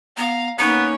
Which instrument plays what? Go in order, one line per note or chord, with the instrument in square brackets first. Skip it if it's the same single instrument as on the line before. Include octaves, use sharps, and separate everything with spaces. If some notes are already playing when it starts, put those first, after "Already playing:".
[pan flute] B3 [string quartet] F5 A#5
[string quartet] A#3 C#4 C#5 [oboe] B3 [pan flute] D#4